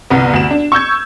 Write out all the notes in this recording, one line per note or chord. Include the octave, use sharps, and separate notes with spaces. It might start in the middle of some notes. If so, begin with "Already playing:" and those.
G1 C2 B3
D2 E7
D4
C#6 E6 G6 G#6